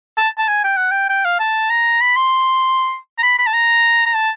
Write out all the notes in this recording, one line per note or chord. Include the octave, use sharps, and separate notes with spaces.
A5
A5
G#5
G5
F#5
G5
G5
F5
A5
A#5
B5
C6
A#5
B5
B5
A5
A#5
A#5
A5